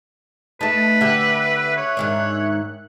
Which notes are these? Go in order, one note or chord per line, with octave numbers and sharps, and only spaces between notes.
A3 D#4 B4 A5
D3 G4 E5 F#6
C#5
G#2 D#3 D4